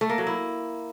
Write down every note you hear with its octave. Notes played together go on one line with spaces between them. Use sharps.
A3
A#3
F#3
E4